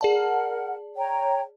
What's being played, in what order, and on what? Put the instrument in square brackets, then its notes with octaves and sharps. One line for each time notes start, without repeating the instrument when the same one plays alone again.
[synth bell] G#4 D5 A5 [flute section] A#4 F#5
[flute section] C#5 G5 A#5